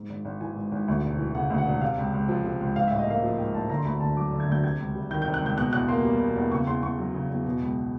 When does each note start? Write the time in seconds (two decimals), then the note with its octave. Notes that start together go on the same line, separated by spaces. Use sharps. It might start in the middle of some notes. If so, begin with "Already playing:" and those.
Already playing: G#2
0.09 G#1
0.25 G#1
0.41 E3 G#5
0.56 G#2
0.72 G#1
0.88 D2
1.04 E1
1.18 E3
1.35 C#3 F#5
1.50 D2
1.58 F#5
1.65 E1
1.81 C3 F5
1.98 C#2
2.13 C#2
2.28 F3
2.44 C3
2.60 C#2
2.75 G#2 F5
2.87 A1 E5
2.99 D#5
3.07 A#3 F5
3.23 F3
3.38 G#2 G5
3.54 A1 A5
3.70 D3 A#5
3.78 C6
3.85 D2 B5
4.00 D2 A5
4.17 F#3 D6
4.32 D3
4.40 G#6
4.48 D2 G6
4.63 C3 G#6
4.79 C#2
4.95 G3
5.11 D#3 G6
5.22 C3 G6
5.34 F#6
5.41 C#2 G6
5.57 B2 F#6
5.73 E2 F#6
5.88 A#3 C6
6.04 G3
6.20 B2
6.36 E2
6.51 C#3 C#6
6.67 E2 C6
6.83 E2 C#6
6.99 F#3
7.14 C#3
7.30 E2
7.45 B2
7.61 C#2